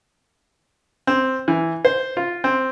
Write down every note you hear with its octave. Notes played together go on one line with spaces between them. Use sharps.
C4
E3
C5
F4
C4